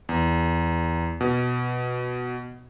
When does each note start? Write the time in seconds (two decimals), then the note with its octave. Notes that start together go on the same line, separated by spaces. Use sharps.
0.09 E2
1.21 B2